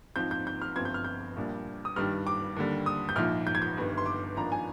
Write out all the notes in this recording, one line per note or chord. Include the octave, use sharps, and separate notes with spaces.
G#2 F3 C4 G6
G6
G6
F6
G1 G2 F3 C4 G#6
G6
F6
G6
A#1 A#2 G3 D4
D#6
G2 D#3 G3 D4 F6
D6
D#2 D3 G3
D#6
G6
A#1 G#2 F3 F6
G6
G#6
G6
G1 G2 D#3
C6
D6
G#1 G#2 F3 A#3 D4 A#5
G#5